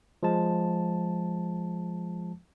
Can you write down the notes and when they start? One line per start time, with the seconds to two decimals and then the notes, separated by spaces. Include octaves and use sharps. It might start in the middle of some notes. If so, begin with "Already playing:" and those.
0.23 F3 G#3 A5